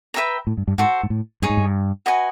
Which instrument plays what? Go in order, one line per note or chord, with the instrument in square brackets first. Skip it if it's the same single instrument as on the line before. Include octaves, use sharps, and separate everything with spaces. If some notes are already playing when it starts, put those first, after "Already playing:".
[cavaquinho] B4 E5 G5 A#5
[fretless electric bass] A2
G2
G2
[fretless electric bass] G#2 [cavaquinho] F#4 A4 C5
[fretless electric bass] G#2
A2
[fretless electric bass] G2 [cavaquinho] D#4 G#4 C#5
[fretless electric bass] G#2
G2
[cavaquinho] F#4 B4 D#5 G#5